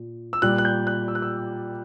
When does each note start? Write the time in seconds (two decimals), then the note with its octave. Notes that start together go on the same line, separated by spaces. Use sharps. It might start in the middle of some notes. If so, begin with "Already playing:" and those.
Already playing: A#2
0.33 E6
0.42 A#2 G3 F#6
0.58 F#6
0.65 G6
0.87 F#6
1.08 E6
1.15 F#6
1.22 E6